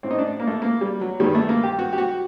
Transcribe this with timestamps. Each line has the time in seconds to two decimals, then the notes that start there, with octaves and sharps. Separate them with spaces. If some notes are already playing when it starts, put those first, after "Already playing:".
0.03 A2 C4
0.11 D#4
0.19 D4
0.40 A#3
0.47 A3
0.62 A#3
0.81 G3
1.01 F#3
1.20 G2 D#3 G3
1.35 A3
1.49 A#3
1.64 G4
1.79 F#4
1.93 G4
1.98 F#4